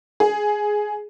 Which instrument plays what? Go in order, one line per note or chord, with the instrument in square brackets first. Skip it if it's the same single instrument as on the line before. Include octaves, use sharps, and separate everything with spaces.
[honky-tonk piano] G#4